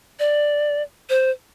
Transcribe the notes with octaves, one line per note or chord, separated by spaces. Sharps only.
D5
C5